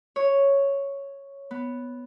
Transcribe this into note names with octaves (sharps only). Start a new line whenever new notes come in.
C#5
B3